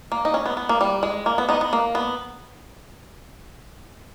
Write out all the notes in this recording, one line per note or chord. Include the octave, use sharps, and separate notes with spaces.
A#3
D#4
C#4
B3
B3
A#3
G3
G#3
A#3
B3
B3 D#4
B3
A#3
B3